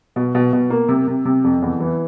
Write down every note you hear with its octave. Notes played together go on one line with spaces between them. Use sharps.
B2
B2
B2
A#3
C3
C3
C3
F2
E2
E3